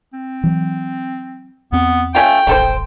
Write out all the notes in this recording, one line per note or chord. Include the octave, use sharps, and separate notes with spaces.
C4
E3 F#3
E2 B3 C4
A3 C#4 F4 G5
D#1 A1 A3 A4 C5